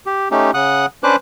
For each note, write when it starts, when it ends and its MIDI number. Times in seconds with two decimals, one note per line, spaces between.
0.06 0.28 67
0.31 0.51 57
0.31 0.51 61
0.31 0.51 63
0.31 0.51 67
0.54 0.86 49
0.54 0.86 78
0.54 0.86 87
0.54 0.86 90
1.03 1.16 61
1.03 1.16 62
1.03 1.16 71
1.03 1.16 72
1.03 1.16 86
1.03 1.16 90